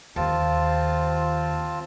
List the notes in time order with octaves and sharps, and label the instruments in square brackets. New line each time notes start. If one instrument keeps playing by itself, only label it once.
[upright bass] D#2 [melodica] C4 F4 A5